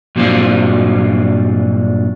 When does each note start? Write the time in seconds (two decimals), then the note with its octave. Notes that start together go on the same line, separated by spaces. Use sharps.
0.16 G2 A#2 F#3 C4 D4 F4